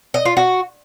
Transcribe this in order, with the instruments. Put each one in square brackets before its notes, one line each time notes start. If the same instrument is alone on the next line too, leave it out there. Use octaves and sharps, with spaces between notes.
[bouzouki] D#5
F4
F#4